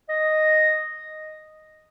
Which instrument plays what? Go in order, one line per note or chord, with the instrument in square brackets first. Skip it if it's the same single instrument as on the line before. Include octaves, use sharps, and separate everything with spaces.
[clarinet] D#5